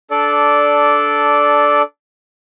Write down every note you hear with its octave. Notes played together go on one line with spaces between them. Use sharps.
D4 A4 D5